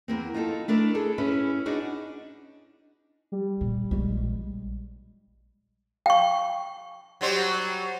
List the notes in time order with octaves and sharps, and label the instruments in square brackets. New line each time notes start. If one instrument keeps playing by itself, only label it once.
[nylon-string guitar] E2 A#3 C4
D#4 F4 G4 A4
A3 D4 E4 A#4
G#4 A4
C#4 E4 G#4 B4
D4 D#4 F#4 G#4
[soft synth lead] G3
[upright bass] A#2
A#1 G#3
[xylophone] F5 [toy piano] G5 C#6
[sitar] F#3 G3 C5